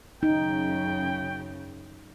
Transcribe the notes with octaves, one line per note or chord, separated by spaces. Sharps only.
F#2 C#3 D#4 G5